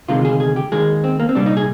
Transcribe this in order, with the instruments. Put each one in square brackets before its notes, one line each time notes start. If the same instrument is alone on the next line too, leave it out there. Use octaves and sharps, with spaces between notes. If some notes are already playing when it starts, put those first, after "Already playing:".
[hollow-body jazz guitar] D2 C3 D#3 G#3 F4
G#4
G#4
G4
D#2 D#3 G#3 G#4
C4
A#3
C4
C2 A#2 G3 D4
D#4
G#4